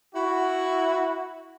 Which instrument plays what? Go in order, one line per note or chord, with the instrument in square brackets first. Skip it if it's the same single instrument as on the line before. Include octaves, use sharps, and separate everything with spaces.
[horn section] E4 F#4